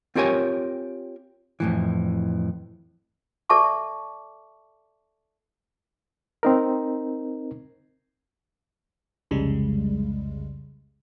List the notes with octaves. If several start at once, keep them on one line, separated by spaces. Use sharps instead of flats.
C4 F4 G4 A#4 C#5 G#5
F2 A2 E3
A4 D5 E5 A5 C#6 D6
C4 D#4 A#4
C2 F2 C#3 G3 G#3